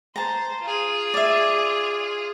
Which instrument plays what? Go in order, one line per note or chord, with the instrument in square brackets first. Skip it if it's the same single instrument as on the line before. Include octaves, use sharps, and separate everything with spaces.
[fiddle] C5 [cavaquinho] A5 A#5
[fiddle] F4 G#4
[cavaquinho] D5 E5